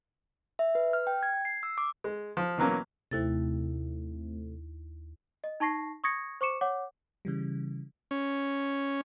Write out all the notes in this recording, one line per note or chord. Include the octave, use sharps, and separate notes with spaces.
E5
B4
F6
G5
G#6
C7
E6
D6
G#3
F3
B2 E3 F#3 A#3 C#4
D#2 C3 A3 C4 E4 A6
D#5
D#4 A5 C#6 A#6 C7
C#6 D#6 G#6 A#6 C#7
C5 C#6 D6 C#7 E7
C#5 F#5 D6
C#3 E3 G3
C#4